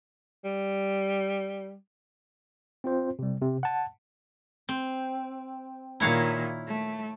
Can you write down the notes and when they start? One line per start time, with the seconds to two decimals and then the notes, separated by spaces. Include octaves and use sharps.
0.45 G3
2.84 C4 F4 C5
3.19 C3 G3
3.42 C3
3.63 F#5 A5
4.69 C4
6.00 A#2 D#3 E4 C#5 F5
6.67 A3